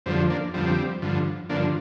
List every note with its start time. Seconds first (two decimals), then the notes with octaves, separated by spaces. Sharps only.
0.06 F2 D3 F3 G3 C4
0.30 A#3 D4
0.54 F2 D3 F3 G3 C4
1.02 G2 D3 F3
1.50 G2 D3 F3 A#3 D4